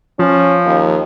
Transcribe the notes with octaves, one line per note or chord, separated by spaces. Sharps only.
F3 C#4
D#2